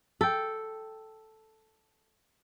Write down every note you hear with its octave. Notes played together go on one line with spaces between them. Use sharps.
A4 G5